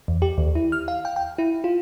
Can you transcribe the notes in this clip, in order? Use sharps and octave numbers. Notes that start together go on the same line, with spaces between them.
E2
G4
D#2
E4
F6
F5
G5
G5
E4
F4